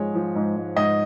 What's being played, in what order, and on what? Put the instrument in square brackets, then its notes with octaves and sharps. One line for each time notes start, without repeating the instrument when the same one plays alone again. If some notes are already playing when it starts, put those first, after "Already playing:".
Already playing: [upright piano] G#2 F3 G#3 C#5
F3
G#2
G#2
G#2 D#5